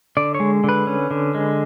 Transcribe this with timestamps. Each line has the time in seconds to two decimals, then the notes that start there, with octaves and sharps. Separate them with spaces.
0.17 D3 D5
0.35 C#5
0.40 G#3
0.64 D3 B4
0.87 C#4
1.11 D3
1.35 G#3